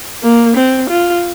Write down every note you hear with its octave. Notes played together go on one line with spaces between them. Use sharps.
A#3
C4
F4